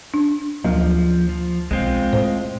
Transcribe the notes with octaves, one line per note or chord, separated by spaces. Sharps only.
D4
D2 F3 F#3 A#3
F3
B1 G#3 C4 F4
A2 C5